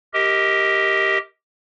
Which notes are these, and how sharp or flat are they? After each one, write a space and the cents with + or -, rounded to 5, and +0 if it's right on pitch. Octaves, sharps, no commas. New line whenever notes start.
G4 +0 A#4 +0 D#5 +25